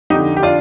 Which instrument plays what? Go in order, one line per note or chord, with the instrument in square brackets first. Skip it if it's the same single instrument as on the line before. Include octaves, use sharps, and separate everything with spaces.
[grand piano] F2 D3 D#4 G4
G4
D4 F4